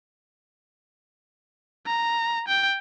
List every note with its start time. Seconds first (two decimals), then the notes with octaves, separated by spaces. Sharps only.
1.86 A#5
2.48 G5